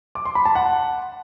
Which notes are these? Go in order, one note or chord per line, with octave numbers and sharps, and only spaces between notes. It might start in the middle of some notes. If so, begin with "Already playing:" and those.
D6
C6
B5
A5
F#5